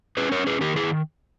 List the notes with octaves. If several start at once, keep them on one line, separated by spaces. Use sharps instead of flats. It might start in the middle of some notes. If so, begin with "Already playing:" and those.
C#4 G#4 B4
A#4 C#5
C#4
G#4 B4
D#3 G4 A#4
E4 G#4
D#3